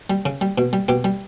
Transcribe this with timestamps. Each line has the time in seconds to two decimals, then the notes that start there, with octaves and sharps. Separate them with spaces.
0.10 G3
0.26 C#3
0.41 G3
0.58 B2
0.73 G3
0.88 B2 G4
1.04 G3